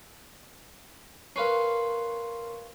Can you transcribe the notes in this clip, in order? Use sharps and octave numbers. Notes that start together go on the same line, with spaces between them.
C#4 A#4 B4 F5 C6 C7